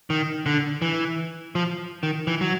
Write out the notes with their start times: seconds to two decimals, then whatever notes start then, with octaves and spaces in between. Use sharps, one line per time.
0.10 D#3
0.46 D3
0.82 E3
1.55 F3
2.03 D#3
2.27 E3
2.41 F#3